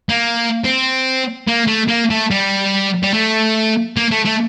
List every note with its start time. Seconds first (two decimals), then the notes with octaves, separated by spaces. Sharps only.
0.09 A#3
0.64 C4
1.48 A#3
1.68 A3
1.89 A#3
2.10 A3
2.31 G3
3.03 G3
3.14 A3
3.97 A#3
4.11 A3
4.25 A3